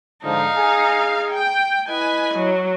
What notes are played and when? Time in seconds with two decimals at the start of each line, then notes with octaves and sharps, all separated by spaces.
0.24 G#2 D3 F3 D#4 F5
0.57 G#4 G#5
1.31 G5
1.88 E4 B4 D#5 G#5
2.35 F#3